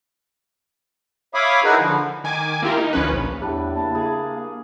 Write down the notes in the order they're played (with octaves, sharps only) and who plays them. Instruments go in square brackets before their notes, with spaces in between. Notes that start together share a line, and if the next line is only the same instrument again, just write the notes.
[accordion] C#5 E5 F5 B5 D6 D#6
D#4 E4 F#4 G#4 A#4 B4
D3 F3
[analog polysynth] D#3 G#5 D6
A#3 E4 F4 G4 A#4
D#4
D2 F3 C#4 B4
A#1
[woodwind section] E2 [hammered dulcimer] A2 G3 D4
[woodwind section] C#3 E4 A5 [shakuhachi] A#3
[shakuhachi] A#3 [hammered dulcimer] G#4